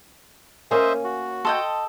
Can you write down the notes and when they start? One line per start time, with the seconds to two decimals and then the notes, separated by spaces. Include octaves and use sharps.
0.71 A#3 C#4 A#4 C5 C#5 D#5 E5 G#5
1.04 F#4
1.45 A4 D#5 G5 C6